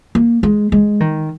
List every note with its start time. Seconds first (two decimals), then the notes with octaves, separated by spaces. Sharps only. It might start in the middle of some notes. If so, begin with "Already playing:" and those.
0.15 A#3
0.43 G#3
0.72 G#3
1.00 D#3